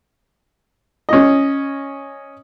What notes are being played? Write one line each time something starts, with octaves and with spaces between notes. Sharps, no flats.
C#4 D#5